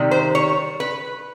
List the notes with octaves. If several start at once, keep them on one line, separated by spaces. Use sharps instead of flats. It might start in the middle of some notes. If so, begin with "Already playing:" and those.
Already playing: C3 D#3 G3
C5
C#5
B4